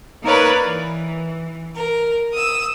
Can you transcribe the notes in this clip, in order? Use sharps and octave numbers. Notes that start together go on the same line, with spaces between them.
A#3 D#4 A#4 B4 C#5 D5
E3
A#4
D#6 E6